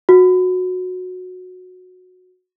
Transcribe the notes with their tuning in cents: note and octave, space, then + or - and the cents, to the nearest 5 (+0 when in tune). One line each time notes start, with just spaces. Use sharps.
F#4 -15